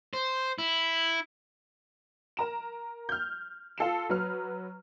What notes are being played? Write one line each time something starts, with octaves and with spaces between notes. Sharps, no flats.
C5
E4
A#4 A#5 E7
F6 G6
F4 A4 C7 E7
F#3 B4 F6